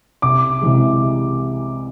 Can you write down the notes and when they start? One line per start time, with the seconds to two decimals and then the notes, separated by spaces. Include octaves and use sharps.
0.22 C2 D6
0.61 C3 E3 G#3